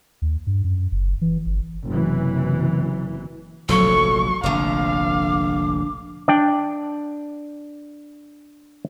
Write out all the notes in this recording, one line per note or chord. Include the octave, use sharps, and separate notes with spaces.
D#2
G2
F#2
F#1
E3
G1
F#1 C3 E3
F1 A#1 D3 F3 F#3 A4 C#6
F1 A#1 D3 F5 A#5 D6
D4 D5 G5